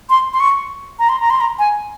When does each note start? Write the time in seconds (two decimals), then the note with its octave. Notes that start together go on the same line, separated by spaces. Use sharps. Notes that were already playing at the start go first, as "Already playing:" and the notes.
0.10 C6
0.33 C6
0.40 C#6
0.99 A#5
1.09 C6
1.20 A#5
1.30 C6
1.41 A#5
1.59 G#5